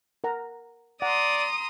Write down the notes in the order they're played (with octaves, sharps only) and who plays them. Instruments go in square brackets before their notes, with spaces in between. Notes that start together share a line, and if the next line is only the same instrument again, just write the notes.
[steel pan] A#4 F#5 A#5
[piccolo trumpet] D5 [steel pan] F#5 [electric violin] A#5 C6 [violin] D#6